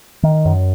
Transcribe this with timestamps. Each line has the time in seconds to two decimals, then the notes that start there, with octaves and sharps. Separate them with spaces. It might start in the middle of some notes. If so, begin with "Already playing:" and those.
0.23 D#3
0.45 F#2